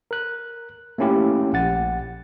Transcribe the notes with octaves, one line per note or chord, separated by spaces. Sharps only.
A#4 F#6
A3 A#3 C#4 E4 G4
A#1 F#5 A6